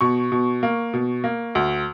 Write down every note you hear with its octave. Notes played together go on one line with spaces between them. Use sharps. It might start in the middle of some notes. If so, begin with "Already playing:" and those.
B2 C#6
B2
A#3
B2
A#3
D2